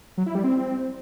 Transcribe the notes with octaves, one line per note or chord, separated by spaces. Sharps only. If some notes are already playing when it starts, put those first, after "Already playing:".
F#3
E4
G3
C4